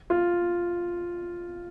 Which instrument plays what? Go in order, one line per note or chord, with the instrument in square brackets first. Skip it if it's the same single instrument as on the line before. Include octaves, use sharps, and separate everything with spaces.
[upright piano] F4